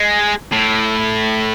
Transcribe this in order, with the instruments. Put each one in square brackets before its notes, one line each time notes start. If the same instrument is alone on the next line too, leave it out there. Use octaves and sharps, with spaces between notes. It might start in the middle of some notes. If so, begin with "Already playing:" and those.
Already playing: [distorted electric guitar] G#3
A2